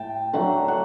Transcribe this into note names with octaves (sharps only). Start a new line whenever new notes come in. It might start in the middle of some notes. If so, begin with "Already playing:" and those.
Already playing: A2 A3 G5 A5
D3 F#3 A3 F#5
F#5